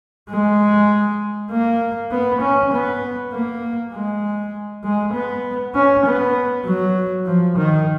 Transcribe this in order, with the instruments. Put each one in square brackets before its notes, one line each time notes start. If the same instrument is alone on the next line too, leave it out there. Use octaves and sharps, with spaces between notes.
[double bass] G#3
A#3
B3
C#4
B3
A#3
G#3
G#3
B3
C#4
B3
F#3
F3
D#3